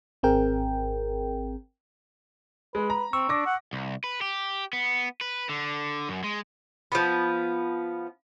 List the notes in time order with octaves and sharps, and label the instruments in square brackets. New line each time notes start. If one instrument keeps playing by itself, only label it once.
[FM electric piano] G#1 C4 G#4 A#4 G5
[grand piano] G#3 [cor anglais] B4
[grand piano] A#5
[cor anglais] C4 [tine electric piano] C#6 E6
[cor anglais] D4 [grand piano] D6 A#6
[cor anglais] F#5
[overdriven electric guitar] C2
B4
G4
B3
B4
D3
F#2
G#3
[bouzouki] F3 B3